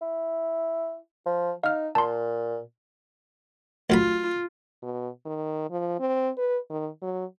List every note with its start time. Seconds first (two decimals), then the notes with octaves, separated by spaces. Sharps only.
0.02 E4
1.26 F3
1.64 D#4 F5 F6
1.95 A#2 A5 C6
3.90 D2 F#3 F4 B5
4.82 B2
5.25 D#3
5.70 F3
6.00 C4
6.38 B4
6.70 D#3
7.02 F#3